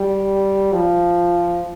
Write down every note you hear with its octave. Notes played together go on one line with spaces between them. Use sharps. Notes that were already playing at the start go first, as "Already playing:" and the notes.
Already playing: G3
F3